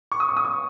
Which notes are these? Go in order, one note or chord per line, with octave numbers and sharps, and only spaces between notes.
C#6
D#6
C#6
D#6
C#6